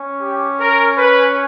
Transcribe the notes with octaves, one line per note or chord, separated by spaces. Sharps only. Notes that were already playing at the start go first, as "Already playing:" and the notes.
Already playing: C#4
G4
A#4
B4